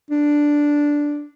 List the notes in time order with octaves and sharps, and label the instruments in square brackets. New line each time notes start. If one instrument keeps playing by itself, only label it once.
[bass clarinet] D4